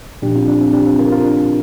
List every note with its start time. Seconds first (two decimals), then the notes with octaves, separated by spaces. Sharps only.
0.22 A#2 F3 D4 G4
0.35 C4 F4
0.48 D4
0.61 C4
0.73 D4 G4
0.87 C4 F4
0.99 F4 A#4
1.12 F4 A#4
1.24 D4